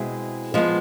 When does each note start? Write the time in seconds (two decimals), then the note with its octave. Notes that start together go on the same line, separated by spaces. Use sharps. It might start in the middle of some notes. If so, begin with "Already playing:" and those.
Already playing: B2 G#3 C4 E4 G#4
0.54 F3 G#3 B3